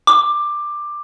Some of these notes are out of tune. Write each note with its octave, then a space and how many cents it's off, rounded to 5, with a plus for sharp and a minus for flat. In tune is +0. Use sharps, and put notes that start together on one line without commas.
D6 +15